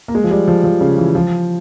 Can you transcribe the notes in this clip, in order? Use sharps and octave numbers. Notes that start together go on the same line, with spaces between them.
A#3
G#3
F3
G3
F3
F3
C#3
E3
F3